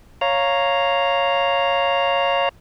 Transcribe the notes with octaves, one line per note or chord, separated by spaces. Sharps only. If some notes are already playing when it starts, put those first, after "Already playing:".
C#5 F5 A#5